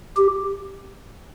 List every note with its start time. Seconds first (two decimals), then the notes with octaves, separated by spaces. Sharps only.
0.17 G4